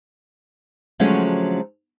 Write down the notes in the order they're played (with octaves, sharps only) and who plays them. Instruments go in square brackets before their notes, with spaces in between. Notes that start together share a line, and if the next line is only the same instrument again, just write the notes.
[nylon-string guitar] D3 F3 F#3 G#3 A3 C#4